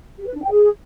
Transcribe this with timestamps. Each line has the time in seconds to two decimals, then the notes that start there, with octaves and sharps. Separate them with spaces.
0.18 G4
0.27 B4
0.35 D4
0.43 G5
0.51 G#4